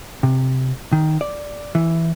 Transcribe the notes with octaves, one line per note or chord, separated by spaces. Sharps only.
C3
D#3
D5
E3